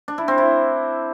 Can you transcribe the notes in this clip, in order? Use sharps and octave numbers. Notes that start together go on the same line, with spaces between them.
D4
E4
C4
E4